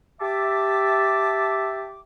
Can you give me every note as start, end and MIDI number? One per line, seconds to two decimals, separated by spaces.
0.21 2.00 67
0.21 2.00 76
0.21 2.00 81
0.21 2.00 86